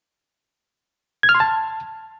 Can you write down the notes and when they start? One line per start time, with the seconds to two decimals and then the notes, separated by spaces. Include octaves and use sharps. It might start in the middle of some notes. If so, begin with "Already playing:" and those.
1.23 G#6
1.29 F6
1.35 C6
1.40 A5